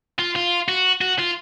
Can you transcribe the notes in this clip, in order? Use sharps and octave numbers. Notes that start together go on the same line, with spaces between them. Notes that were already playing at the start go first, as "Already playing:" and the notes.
F4
F4
F#4
F#4
F4